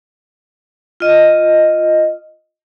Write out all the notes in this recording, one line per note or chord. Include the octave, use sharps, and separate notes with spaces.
F4 D#5